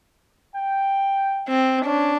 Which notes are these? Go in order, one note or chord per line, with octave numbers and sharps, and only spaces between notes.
G5
C4
C#4 D4